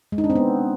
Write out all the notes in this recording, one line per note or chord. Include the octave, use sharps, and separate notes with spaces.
G#3
D#4
D4
C4
B3